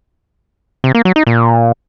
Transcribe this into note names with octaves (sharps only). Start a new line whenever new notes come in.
C3
A#3
F#3
D#4
A#2